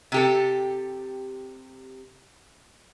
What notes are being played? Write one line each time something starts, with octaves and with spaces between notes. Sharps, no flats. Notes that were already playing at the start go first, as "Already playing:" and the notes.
C3 G4 A4